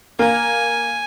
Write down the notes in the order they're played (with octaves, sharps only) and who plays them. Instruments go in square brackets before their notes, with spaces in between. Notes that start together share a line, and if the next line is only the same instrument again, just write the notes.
[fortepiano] A#3 [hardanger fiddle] G#5